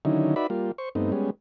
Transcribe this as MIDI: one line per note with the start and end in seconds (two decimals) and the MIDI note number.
0.05 0.35 50
0.05 0.35 51
0.05 0.35 54
0.05 0.35 61
0.05 0.35 63
0.05 0.35 64
0.36 0.47 63
0.36 0.47 66
0.36 0.47 71
0.36 0.47 74
0.36 0.47 76
0.36 0.47 83
0.50 0.72 55
0.50 0.72 58
0.50 0.72 65
0.78 0.89 72
0.78 0.89 85
0.95 1.12 43
0.95 1.12 57
0.95 1.12 59
0.95 1.12 60
0.95 1.12 63
1.12 1.30 55
1.12 1.30 56
1.12 1.30 59
1.12 1.30 61